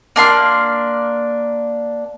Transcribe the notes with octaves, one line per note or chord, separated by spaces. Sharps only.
A#3 D4 C6 F6